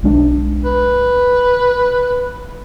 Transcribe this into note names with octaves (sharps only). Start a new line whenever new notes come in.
B1 G#3 D4
B4